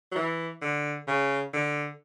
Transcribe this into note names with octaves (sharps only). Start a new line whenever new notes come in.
F#3
E3
D3
C#3
D3